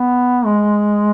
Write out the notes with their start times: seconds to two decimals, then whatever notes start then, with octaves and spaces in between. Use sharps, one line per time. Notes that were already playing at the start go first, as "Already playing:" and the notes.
Already playing: B3
0.45 G#3